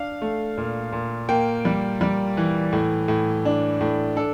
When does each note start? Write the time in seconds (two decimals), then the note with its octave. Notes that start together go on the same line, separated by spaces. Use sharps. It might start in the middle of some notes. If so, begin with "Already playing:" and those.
Already playing: D4 F5
0.22 A3
0.58 A#2
0.92 A#2
1.29 A#3 G5
1.65 G3
2.01 G3
2.37 E3
2.73 A2
3.08 A2
3.45 D4
3.81 A2
4.16 D4 A4